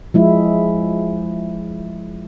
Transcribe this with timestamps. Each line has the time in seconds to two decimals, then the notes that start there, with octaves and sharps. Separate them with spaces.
0.14 F3 G#3 E4